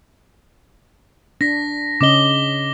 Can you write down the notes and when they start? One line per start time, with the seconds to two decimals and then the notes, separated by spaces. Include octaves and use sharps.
1.41 D4 A#6 B6
2.01 C#3 C#4 D#5 D6 G7